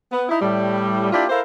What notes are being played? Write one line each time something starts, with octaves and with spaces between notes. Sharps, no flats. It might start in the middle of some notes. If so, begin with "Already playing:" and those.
B3
D#4 E4
A2 G3
A#3 D4 E4 F4 G4
E4 A4 A#4 C5 F5